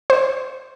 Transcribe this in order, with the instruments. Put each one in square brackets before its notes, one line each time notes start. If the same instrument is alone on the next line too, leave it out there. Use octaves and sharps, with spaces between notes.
[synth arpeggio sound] C5